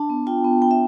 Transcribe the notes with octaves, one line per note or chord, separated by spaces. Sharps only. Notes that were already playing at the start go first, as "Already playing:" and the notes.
Already playing: D4 A5
B3
F4 G5
B3
B3 G5
E5